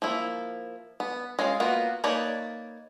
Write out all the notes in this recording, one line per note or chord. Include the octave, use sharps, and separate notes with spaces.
F3 A#3 E4
B3
G#3 C#4 F4 F5
A#3 B3 F4 F#4 A#4
A#3 D#4 B4 C#5 D5